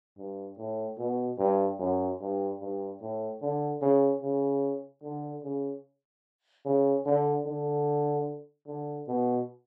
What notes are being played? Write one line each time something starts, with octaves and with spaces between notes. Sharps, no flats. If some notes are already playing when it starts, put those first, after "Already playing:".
G2
A2
B2
G2
F#2
G2
G2
A2
D3
C#3
C#3
D3
C#3
C#3
D3
D3
D3
B2